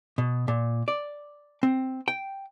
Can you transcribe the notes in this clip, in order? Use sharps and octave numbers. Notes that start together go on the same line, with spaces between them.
B2
A#2
D5
C4
G5